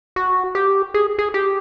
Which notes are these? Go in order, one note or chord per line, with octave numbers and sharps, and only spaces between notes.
F#4
G4
G#4
G#4
G4